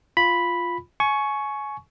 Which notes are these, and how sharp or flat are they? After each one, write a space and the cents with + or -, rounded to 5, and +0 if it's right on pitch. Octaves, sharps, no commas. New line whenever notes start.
F4 +0 B5 +0
G#5 +25 C#6 +0